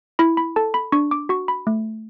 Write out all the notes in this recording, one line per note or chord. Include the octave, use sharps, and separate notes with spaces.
E4 B5
B5
A4 A5
B5
D4 C#6
D6
F#4 C#6
B5
A3